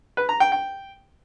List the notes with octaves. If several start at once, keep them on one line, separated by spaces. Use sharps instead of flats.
B4
A#5
G5
G5